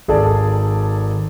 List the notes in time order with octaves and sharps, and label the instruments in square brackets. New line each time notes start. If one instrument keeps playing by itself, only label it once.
[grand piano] G#1 G#4 A4 D5 A5